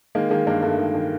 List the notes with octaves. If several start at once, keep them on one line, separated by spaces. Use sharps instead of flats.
D#3 G#3 A#3
D#3 G#3 A#3
G2 G#3 A#3
G2 A3
D#3 G#3
D#3